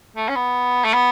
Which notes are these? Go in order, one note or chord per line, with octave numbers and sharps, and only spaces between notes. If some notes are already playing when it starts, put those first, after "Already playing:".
A3
C#4
B3
A3
B3